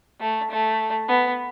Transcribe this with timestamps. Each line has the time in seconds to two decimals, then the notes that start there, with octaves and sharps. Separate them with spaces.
0.20 A3
0.50 A3
1.08 B3